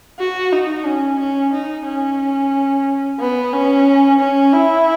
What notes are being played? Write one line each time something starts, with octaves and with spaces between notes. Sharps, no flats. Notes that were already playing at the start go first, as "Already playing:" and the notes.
F#4
D#4
C#4
C#4
D#4
C#4
B3
C#4
C#4
E4